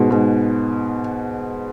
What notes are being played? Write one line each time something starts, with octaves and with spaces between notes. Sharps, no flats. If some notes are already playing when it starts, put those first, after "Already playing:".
Already playing: G#2 B2
G#2